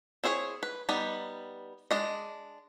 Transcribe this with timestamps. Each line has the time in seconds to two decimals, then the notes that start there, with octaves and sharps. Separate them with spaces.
0.24 C4 E4 G#4 B4 C#5
0.63 B4
0.89 G3 B3 D#4 B5
1.91 G#3 D4 D#5